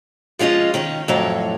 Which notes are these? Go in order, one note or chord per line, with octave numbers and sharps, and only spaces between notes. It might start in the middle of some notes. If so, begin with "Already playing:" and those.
F3 G#3 C#4 F4 D#5
D#3 C#4 C#5
F2 A2 F#3 A4 C#5